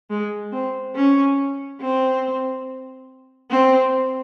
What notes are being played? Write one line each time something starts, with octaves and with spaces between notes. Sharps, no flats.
G#3
C4
C#4
C4
C4